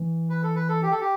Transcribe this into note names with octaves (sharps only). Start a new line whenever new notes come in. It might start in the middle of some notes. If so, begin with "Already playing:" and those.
Already playing: E3
B4
A4
B4
A4
G4
A4
G4